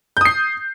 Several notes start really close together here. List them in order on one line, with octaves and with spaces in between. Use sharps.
G6 D#6 C7